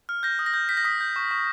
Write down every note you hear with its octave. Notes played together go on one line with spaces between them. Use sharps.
F6
G6 A#6
D#6
A#6
G6
G6 B6
A#6
D#6 B6
G6
C#6
C#6